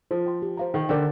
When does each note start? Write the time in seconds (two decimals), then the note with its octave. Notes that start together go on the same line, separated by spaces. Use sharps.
0.11 F3 C5
0.26 G5 C6
0.42 G4
0.57 C5 F5 A#5
0.74 D#3 D#4
0.89 D3 A#4 D5 G5